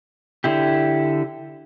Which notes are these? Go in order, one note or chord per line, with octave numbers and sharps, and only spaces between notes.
D3 E4 G4